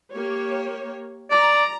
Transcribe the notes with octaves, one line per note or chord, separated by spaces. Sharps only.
A#3 G4 C#5
D5 A#5